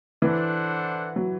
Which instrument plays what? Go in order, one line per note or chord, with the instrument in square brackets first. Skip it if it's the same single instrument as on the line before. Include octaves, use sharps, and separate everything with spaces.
[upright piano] E3 [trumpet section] D4 A4 C5 F#5
[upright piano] F#3